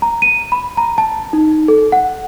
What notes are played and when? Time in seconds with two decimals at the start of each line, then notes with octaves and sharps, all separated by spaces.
0.02 A#5
0.22 D#7
0.52 B5
0.77 A#5
0.98 A5
1.33 D#4
1.68 A4
1.92 F#5